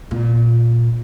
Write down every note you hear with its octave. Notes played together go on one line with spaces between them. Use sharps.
A#2